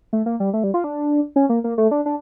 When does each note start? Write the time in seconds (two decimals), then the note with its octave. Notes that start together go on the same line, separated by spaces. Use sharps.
0.13 A3
0.26 A#3
0.40 G3
0.53 A3
0.64 G3
0.74 F4
0.84 D4
1.36 C#4
1.49 A#3
1.64 A#3
1.78 A3
1.91 D4
2.06 D4